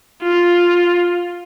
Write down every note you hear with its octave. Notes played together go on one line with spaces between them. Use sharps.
F4